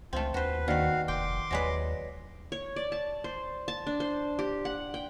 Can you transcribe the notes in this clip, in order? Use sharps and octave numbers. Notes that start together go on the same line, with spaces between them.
C#2 A3 C4 F4
D#2 F#4 B4 C5
D#3 A#3 F#4 B4 D5 F5
F1 G5 C6 D6
D#2 F#3 G#3 B4 C#5 D5 A#6
C#5
D5
A5
C5
A5
D4
C5
G4
F#5
G5